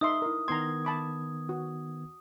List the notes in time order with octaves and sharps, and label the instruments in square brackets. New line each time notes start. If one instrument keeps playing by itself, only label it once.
[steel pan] D#4 E5 C6 [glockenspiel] D#6
[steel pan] E4 A#4
[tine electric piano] D#3 B3 G#6 [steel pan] A#5 C6
[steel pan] A5 B5 D6
F#4